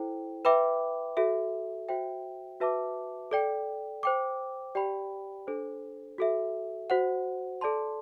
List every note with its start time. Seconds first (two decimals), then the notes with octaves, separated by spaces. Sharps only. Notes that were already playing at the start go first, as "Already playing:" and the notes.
Already playing: E4 A4 C5 G5
0.45 B4 E5 G5 B5 D6
1.17 F#4 A4 E5
1.88 F#4 C5 E5 G5
2.60 F#4 B4 E5 A5 D6
3.31 A4 D5 G5
4.03 C5 G5 D6
4.75 G4 D5 G5 B5
5.47 D4 A4 C5
6.18 F#4 A4 E5
6.90 F#4 C5 F#5
7.61 A4 D5 A5 C6